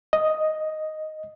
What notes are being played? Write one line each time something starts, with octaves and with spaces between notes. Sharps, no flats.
D#5